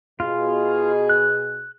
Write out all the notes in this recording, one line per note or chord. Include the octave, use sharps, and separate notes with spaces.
B2 F4 G#4
F#6